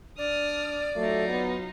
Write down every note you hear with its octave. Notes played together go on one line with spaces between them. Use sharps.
D4 D5 D#6 F6
F#3 A3 D#4 F4
B3